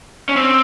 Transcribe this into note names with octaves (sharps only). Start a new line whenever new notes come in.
C#4
C4